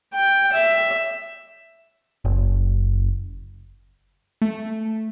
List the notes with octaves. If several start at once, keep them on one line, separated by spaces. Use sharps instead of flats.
G5
E5
F#1
A3